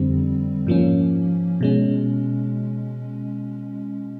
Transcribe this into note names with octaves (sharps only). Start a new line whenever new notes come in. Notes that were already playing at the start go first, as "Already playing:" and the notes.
Already playing: F2 D3 G3 C4
G#2 F3 A#3 C#4
B2 G#3 C#4